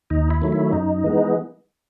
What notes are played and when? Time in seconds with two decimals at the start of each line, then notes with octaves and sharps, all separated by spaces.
0.10 D#2 D#4
0.31 E4
0.42 D#3 F#3 A3
0.52 E4
0.73 F#2 D#4
1.04 E3 G#3 B3